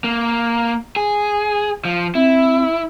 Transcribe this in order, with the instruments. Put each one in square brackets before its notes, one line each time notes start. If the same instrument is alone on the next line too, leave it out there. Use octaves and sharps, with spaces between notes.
[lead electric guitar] A#3
G#4
F3
[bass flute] C4 [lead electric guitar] E4